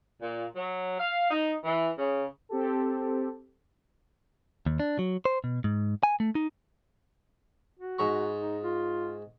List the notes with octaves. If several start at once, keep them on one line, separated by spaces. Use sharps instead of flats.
A#2
F#3
F5
D#4
E3
C#3
C4 G4 A4
D#2
D4
F#3
C5
B2
G#2
G#5
A3
D#4
F#4
G#2 A#5 C#6
D#4
F4